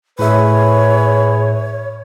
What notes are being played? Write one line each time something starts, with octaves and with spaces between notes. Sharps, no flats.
A2 G#4 B4 C#5 E5